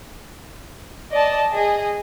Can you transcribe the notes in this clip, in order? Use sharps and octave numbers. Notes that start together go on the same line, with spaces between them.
D5 D#5 A5
G#4 D#5